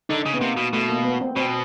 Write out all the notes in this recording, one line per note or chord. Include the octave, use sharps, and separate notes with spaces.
D3 D#4
C#3
B3
C3 A#3
B2
B2 A3
A#3
B3
C4
B2 C4